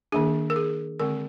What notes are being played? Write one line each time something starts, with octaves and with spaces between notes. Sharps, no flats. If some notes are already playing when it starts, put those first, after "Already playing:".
D#3 A#3 D4 G#4
A#4
G#4
D3 G#3 C4 A#4